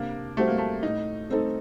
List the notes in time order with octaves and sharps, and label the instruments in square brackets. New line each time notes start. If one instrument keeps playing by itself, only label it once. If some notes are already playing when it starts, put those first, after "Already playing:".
Already playing: [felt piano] C3 [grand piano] A#3 D4
[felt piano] G3 C4 F#4 C5 [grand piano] A3
[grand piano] A#3
A3
[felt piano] A2 [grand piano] D#4
[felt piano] A3 C4 D#4 A4